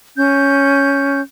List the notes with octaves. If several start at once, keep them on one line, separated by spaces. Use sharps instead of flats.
C#4 G6